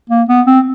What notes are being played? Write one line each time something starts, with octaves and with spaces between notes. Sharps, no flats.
A#3
B3
C4